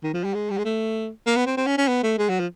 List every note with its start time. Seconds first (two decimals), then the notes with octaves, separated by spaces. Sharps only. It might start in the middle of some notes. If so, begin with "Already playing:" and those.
0.03 D#3
0.14 F3
0.24 G3
0.34 G#3
0.50 G3
0.58 G#3
0.65 A3
1.26 A#3
1.36 B3
1.46 C4
1.57 C4
1.67 C#4
1.78 C#4
1.88 B3
2.03 A3
2.18 G#3
2.29 F#3
2.39 F3